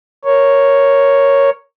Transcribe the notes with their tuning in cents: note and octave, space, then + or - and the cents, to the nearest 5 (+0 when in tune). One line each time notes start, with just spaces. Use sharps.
A#4 +0 C#5 +0